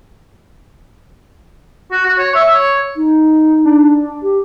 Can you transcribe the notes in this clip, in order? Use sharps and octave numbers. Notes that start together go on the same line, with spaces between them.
F#4
F#4
C#5
E5
C#5
D#4
D4
G4